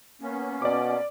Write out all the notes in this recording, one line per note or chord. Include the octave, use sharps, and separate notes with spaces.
A#3 B3 C#4
B2 D5 D6